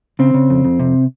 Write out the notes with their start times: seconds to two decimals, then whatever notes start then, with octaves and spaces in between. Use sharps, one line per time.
0.19 C#3 C4
0.34 C#3
0.50 F2
0.65 F2
0.80 C3